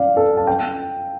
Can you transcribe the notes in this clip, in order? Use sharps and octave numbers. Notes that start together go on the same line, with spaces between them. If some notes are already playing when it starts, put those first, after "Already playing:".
Already playing: D5 F5
A4
A5
G5